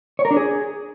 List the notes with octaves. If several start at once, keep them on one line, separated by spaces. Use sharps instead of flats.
C#5
A#4
D4
G#4